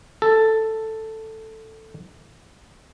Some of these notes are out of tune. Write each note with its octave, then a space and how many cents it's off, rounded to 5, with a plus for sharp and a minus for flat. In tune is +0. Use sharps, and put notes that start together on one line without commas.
A4 +5